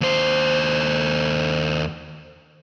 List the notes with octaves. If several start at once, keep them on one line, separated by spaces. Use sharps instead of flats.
D#2 C5